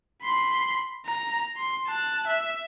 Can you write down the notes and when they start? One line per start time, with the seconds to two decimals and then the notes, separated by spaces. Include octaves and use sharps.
0.23 B5 C6
1.05 A#5
1.57 C6
1.88 A5 F#6
2.27 E5